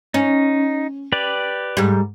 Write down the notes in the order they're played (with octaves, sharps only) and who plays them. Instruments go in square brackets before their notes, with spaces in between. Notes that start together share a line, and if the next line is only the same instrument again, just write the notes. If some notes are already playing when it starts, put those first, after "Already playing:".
[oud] C#4 [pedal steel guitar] D#4
[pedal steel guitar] G4 B4 D5
[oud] G#2 G3